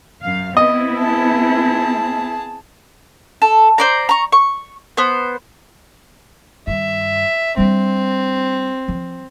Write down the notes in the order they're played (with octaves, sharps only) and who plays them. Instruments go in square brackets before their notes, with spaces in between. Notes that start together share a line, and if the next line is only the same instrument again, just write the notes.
[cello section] F#2 F5
[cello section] B3 C4 E4 [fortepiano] D#5
[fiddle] G#4 A5
[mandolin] A4
C5 D5 A#5
A#5 C#6
C#6
B3 C5
[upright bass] G2 D#3 [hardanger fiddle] E5
[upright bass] G3 D4 [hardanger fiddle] C4
[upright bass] F3